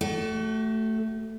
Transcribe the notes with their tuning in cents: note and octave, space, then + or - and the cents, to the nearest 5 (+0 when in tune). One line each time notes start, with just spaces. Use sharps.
A3 +0 F#4 +40